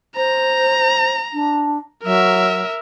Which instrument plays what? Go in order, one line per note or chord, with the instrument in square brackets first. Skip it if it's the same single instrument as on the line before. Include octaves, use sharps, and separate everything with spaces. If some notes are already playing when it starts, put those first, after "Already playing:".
[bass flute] C5 [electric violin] A#5
[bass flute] D4
[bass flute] F#3 [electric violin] A#4 E5